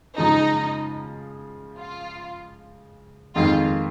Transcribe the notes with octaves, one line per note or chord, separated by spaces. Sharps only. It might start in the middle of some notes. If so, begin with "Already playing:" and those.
C#3 F3 G#3 D#4
F4
F2 D#3 G#3 C4 F4